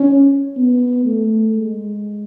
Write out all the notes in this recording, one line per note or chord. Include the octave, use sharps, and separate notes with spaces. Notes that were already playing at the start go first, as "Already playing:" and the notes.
Already playing: C#4
B3
A3
G#3